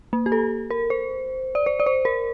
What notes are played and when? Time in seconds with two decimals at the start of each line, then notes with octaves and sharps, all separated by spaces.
0.13 A#3
0.26 G4
0.32 A4
0.71 A#4
0.90 C5
1.55 D5
1.66 C5
1.80 D5
1.86 C5
2.05 A#4